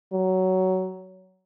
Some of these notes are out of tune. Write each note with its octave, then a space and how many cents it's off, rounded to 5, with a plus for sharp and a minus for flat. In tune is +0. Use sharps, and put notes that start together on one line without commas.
F#3 +15